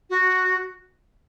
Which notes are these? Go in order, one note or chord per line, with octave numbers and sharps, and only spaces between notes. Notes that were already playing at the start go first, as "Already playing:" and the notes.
F#4